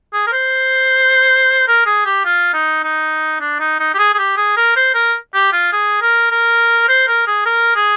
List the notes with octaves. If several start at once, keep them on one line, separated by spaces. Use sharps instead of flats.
G#4
A#4
C5
A#4
G#4
G4
F4
D#4
D#4
D4
D#4
D#4
G4
G#4
G#4
G4
G#4
A#4
C5
A#4
G4
F4
G#4
A#4
A#4
C5
A#4
G#4
A#4
G#4